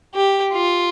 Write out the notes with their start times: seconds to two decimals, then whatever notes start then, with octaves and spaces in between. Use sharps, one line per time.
0.14 G4
0.53 F4